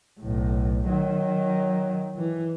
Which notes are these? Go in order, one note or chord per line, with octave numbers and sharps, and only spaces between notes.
B1 A2
D#3 F#3
E3